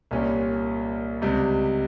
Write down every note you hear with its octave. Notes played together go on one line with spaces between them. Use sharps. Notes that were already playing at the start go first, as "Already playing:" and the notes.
C2 A#2 G3 C#4
C#2 C3 G3